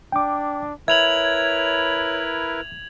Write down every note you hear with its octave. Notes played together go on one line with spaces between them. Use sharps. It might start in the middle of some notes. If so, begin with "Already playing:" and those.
D4 G5 D6
E4 A#4 B4 C#5 E5 G#6 F7 F#7